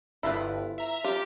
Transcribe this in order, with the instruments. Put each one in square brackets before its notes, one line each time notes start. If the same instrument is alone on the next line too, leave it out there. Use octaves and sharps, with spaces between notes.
[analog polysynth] G1 [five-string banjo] E4 F4 B4
[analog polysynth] E5 A#5
[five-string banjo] F4 [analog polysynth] G4